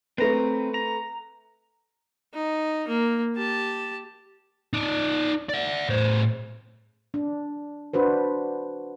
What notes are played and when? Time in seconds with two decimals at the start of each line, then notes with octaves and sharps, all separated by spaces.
0.18 A3 C4 B4 A#5
0.74 A#5
2.34 D#4
2.88 A#3
3.35 G4 A5
4.73 D#4 D5
5.49 D5 E5
5.89 A2 C5
7.14 D4
7.94 D4 F#4 B4 C5